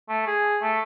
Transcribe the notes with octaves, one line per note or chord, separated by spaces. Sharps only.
A3
G#4
A3